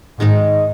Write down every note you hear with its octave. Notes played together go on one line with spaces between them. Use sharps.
G#2 D#3 G#3 D#4